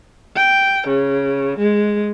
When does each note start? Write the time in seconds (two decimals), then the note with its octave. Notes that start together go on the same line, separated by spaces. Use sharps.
0.36 G5
0.87 C#3
1.58 G#3